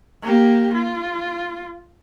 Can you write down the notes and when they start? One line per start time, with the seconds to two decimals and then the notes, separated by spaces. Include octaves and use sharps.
0.22 A#3 G4
0.74 F4